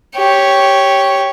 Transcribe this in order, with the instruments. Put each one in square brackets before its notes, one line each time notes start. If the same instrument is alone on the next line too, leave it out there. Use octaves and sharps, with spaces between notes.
[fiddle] G4 C#5